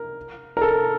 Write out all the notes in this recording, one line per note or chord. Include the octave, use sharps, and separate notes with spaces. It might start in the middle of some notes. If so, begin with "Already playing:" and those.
Already playing: A#4
A#4
A4